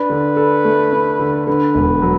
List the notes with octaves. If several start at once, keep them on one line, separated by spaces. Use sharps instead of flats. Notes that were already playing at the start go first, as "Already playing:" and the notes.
Already playing: D4 B4
D3
A4
A3
D4
D3
D3 B4
E1
F#3